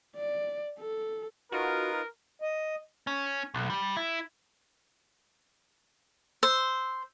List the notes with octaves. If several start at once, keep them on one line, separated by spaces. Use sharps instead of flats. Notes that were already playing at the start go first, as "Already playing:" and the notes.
D5
A4
D#4 F4 F#4 A#4 B4
D#5
C#4
B1
G3
E4
C5 E6